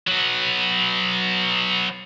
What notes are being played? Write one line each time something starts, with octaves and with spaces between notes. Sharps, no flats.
F#3 B3